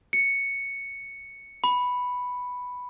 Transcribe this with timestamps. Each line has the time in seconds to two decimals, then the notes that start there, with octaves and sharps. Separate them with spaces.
0.13 C#7
1.64 B5